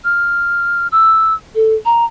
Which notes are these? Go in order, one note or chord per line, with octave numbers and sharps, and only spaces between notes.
F6
E6
A4
A#5